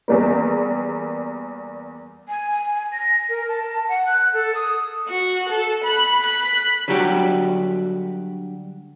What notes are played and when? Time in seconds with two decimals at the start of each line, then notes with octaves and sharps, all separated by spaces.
0.08 E2 G3 A#3
2.28 G#5
2.51 G#5
2.74 G#5
2.92 A#6
3.29 A#4
3.48 A5
3.88 F#5
4.06 F#6
4.33 A4
4.55 D#6
5.08 F#4
5.49 A4
5.84 B5 F#6
6.24 F#6 B6
6.88 D3 F#3 G3 F#4 G4